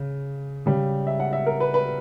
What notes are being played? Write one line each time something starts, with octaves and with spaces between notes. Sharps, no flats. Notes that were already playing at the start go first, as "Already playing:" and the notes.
Already playing: C#3
C#3 G3
E5
F#5
E5
A#4
B4
B4